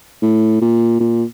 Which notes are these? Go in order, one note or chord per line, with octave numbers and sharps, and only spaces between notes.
A2
A#2
A#2